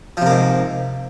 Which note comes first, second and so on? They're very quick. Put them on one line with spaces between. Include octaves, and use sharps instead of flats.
F3 C3 A#3 G#2